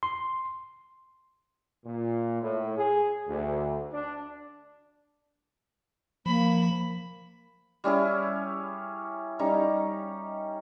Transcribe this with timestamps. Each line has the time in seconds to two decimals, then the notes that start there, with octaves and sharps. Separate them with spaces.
0.03 C6
1.85 A#2
2.41 A2
2.77 G#4
3.28 D2
3.92 D4
6.26 F3 A#3 B5
7.84 G3 C#4 E4 G#4
9.39 G3 C#4 D#4